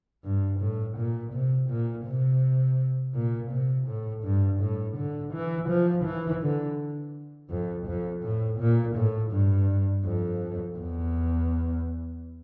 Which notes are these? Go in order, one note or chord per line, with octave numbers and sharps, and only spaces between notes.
G2
A2
A#2
C3
A#2
C3
A#2
C3
A2
G2
A2
D3
E3
F3
E3
D3
F2
F2
A2
A#2
A2
G2
F2
E2